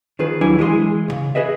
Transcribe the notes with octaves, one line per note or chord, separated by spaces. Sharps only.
D#3 F3 G#4 B4
D#2 F#3 D4 E4 G#5
E3 G#3 G#4 C6
B1 C#3
G#4 B4 D#5 E5